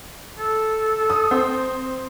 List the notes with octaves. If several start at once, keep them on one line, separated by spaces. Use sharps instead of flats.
A4
D#6
C4